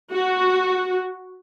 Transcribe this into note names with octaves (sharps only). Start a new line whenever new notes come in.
F#4